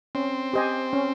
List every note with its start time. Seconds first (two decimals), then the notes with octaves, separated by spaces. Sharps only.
0.15 C4 C#4
0.53 G4 C5 D#5 G#5
0.93 C#4